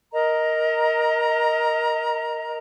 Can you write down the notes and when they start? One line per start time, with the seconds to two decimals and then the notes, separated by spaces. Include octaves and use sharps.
0.13 A#4 D#5 A#5